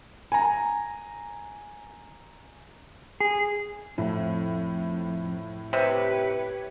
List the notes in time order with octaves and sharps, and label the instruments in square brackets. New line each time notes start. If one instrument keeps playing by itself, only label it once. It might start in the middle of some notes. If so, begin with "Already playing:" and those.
[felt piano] G#5 A#5
[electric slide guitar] G#4
[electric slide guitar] F2 [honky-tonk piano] A2
[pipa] C3 [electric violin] G4 B4 [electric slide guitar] C#5